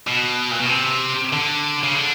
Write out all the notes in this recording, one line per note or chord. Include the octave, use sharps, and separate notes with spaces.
B2
A#2
B2
C3
D3
C#3
D3